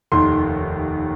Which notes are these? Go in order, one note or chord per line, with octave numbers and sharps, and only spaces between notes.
F1 D#2 D#3 C6